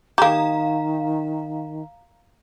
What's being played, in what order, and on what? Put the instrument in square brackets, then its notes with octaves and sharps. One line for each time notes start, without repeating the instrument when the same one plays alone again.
[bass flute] D#3 [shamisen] A#3 G4 [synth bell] F5 A#5